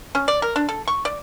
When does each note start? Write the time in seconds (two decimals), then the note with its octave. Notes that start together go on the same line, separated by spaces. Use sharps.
0.15 C#4
0.28 D5
0.42 A#4
0.56 D4
0.69 A4
0.88 C#6
1.05 D5